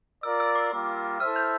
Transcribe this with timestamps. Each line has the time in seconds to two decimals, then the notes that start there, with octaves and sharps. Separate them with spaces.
0.23 F4 A#4 D5 E6
0.40 E6
0.55 D6
0.72 G3 A#3 F4 A#4
1.20 E4 A4 C5 E5 F6
1.36 G6